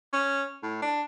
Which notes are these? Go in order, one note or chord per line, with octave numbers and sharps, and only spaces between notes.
C#4
A2
D4